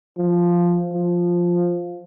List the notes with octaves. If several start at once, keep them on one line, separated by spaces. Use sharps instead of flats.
F3
F3